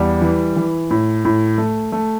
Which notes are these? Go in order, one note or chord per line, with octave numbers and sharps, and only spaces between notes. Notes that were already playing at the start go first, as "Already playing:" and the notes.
Already playing: E2 G3
E3
E3
A2
A2
A3
A3